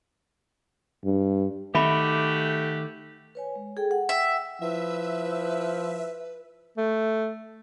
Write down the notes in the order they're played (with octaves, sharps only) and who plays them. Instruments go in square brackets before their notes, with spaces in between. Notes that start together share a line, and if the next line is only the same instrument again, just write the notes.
[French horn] G2
[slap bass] D#3 [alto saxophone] A3 [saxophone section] F#4 G4 [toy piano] E5 B5
[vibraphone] B4 C#5 G#5
G#3
G#4 A4 G5
F#5
[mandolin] E5 [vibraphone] F#5 G5
[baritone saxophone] F3 [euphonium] E4 [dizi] B4 [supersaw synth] E5
[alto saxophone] A3